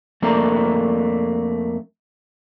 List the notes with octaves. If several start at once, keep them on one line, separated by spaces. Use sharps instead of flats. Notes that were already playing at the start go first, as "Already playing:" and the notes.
F2 A3 A#3 D4 A#5